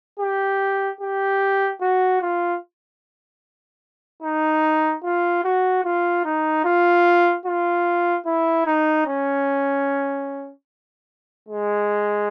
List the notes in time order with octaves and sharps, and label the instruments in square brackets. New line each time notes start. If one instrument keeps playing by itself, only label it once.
[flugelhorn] G4
G4
F#4
F4
D#4
F4
F#4
F4
D#4
F4
F4
E4
D#4
C#4
G#3